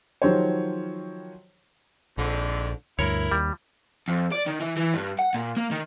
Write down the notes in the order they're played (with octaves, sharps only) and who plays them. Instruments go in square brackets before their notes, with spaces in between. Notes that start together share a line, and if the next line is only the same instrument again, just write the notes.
[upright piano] D#3 F3 F#3 G4 C5 C#5
[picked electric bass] A#1 [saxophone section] F2 G#2 D3
[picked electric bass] D2 G2 [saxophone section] E4 A#4 [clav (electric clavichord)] C#5
[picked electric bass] D#2 [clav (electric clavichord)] G3
[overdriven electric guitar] F2
D5
D#3
E3
E3
G2
F#5
A#2
A#3
D#3